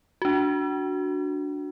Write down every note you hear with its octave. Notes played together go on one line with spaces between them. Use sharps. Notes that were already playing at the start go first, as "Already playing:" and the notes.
D4 F#4